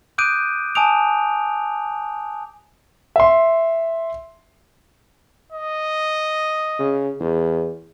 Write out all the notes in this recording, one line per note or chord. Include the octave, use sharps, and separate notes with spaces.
D6 D#6 F#6 G6 D7 D#7
G#5 A5 D#6 D7 F7
E5 C6
D#5
C#3
E2